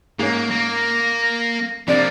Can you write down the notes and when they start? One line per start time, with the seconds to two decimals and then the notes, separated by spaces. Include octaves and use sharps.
0.19 G#2 A#3 C#4
0.50 A#3 A#6
1.88 C3 F3 A#3 D4 D5